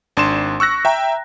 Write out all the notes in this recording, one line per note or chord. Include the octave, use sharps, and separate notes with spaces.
G#1 D4 C6 E7
C#6 E6 F#6 A#6
E5 G5 A#5